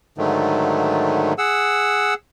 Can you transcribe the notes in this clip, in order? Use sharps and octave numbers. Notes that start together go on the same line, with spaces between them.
G#2 D3 D#3 F#3 A3
G#4 F#5 E6